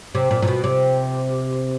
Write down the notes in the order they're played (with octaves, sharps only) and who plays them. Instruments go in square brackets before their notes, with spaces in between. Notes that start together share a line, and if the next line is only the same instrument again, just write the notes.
[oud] C3
A#2
A#2
B2
C3